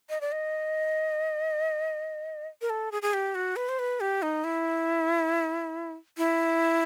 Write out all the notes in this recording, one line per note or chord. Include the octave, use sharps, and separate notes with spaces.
D#5
D5
D#5
A#4
A4
G#4
G#4
G4
F#4
B4
C5
B4
G4
D#4
E4
E4